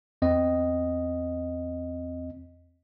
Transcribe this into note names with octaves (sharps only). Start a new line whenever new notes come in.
E2 C4 D#5